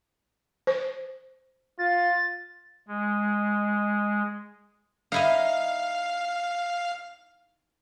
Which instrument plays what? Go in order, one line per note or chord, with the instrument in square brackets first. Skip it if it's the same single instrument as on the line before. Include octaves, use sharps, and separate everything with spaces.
[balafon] C5
[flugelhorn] F4 [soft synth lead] A6
[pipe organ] G#3
[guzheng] D#4 E4 D#5 [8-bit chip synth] F5